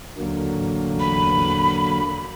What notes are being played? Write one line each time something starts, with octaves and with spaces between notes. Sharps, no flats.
D#2 D3 F#3 A#3
A1 E2
B5